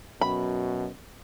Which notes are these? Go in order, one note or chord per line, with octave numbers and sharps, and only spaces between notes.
F#2 B2 B5